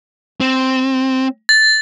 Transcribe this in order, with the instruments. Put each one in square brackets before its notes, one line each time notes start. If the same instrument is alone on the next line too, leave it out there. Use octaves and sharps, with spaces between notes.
[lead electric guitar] C4
[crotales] A6